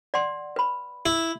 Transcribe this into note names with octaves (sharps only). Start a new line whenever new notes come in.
D5 F#5 C6
B4 B5
E4